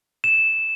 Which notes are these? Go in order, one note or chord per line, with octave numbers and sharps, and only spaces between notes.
E7